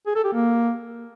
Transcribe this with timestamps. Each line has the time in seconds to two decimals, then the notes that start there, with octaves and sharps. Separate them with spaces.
0.06 G#4
0.15 A4
0.24 G4
0.33 A#3